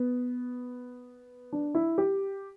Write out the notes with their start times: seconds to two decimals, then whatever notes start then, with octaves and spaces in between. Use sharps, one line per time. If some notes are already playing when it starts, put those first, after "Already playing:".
Already playing: B3
1.53 D4
1.75 E4
1.98 G4